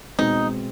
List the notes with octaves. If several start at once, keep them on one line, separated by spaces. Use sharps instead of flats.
B2 G#3 C4 D#4